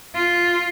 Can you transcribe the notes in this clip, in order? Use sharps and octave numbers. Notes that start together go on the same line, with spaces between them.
F4